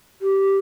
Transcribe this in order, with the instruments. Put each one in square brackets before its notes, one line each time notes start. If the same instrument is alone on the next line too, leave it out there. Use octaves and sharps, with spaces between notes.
[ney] G4